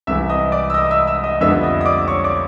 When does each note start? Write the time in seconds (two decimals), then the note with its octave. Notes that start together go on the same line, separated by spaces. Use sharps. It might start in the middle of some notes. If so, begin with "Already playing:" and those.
0.07 C2 C3 E3 E5 E6
0.29 D#5 D#6
0.52 D5 D6
0.70 E6
0.74 D#5 D#6
0.91 E5 E6
1.07 E5 E6
1.24 D#5 D#6
1.41 F2 D3 G3 B3 E5 E6
1.63 D#5 D#6
1.81 D#6
1.86 D5 D6
2.08 C#5 C#6
2.24 D5 D6